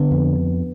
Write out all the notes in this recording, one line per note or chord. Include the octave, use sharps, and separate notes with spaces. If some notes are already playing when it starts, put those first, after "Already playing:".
Already playing: D3 B3
F2